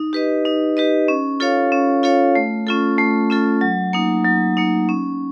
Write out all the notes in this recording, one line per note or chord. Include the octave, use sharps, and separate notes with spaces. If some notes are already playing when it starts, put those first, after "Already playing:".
Already playing: D#4
G4 B4 D#5
D#4
G4 B4 D#5
C#4
F4 A4 C#5 F5
C#4
F4 A4 C#5 F5
A3
C#4 F4 A4
A3
C#4 F4 A4
F#3
A#3 D#4
F#3
A#3 D#4
C#4